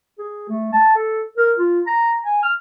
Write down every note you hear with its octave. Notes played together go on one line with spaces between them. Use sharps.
G#4
A3
A5
A4
A#4
F4
A#5
G#5
F6